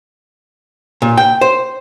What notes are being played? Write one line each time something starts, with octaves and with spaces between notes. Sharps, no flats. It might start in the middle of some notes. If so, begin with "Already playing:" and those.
A#2
G5
C5